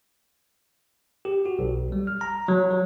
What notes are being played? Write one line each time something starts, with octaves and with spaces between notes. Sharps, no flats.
G4
F#4
B1
G3
F6
A#5
F#3
F#3